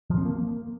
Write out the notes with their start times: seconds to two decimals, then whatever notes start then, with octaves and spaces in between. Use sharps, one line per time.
0.10 F3
0.18 C4
0.25 A#3